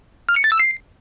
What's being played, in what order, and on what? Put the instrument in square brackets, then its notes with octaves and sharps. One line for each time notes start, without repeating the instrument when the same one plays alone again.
[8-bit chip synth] F6
C#7
A6
E6
C7